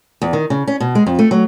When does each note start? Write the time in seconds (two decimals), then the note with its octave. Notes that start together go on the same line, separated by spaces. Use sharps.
0.22 E2
0.33 D#3
0.50 C#3
0.67 C#4
0.80 B2
0.95 G#3
1.06 F2
1.19 A3
1.31 F#3